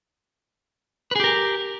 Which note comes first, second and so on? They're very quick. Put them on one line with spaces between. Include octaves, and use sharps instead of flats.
B4 G#4 G4 A#4